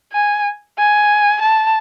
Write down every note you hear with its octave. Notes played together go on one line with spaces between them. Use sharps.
G#5
G#5
A5